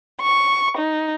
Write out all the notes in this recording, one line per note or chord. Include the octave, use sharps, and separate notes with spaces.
C#6
D#4